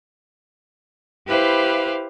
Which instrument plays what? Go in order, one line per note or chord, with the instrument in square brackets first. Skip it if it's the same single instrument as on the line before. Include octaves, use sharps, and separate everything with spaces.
[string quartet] E4 G4 B4 C5 F5